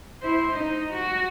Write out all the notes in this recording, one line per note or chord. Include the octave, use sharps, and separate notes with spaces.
E4 C5
D#4
F#4